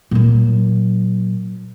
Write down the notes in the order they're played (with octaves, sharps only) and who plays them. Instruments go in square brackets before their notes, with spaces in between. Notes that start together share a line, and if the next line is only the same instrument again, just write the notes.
[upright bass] A#2 F#3